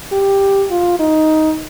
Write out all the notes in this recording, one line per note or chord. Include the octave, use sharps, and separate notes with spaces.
G4
F4
D#4